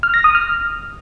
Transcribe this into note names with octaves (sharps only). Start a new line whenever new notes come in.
F6
A#6
D#6
F6